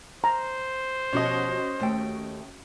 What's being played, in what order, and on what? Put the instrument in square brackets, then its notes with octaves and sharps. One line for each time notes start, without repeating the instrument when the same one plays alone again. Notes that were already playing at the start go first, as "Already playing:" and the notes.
[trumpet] C5 [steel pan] A#5
[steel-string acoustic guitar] B2 F3 G4 [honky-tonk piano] C#4 F#4 D#5
[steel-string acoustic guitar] D#2 A3 G5